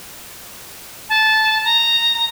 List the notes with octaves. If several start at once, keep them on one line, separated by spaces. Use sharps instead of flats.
A5
A#5